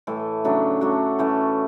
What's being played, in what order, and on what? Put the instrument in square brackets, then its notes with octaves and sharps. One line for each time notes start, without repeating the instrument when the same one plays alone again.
[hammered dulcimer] A2 E3 A3
C#3 F#3 A3 D4
F#3 A3 D4 F#4
E3 A3 C#4